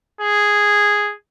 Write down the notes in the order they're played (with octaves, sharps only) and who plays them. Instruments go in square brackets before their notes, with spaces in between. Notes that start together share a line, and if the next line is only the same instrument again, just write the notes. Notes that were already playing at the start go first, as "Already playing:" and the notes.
[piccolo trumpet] G#4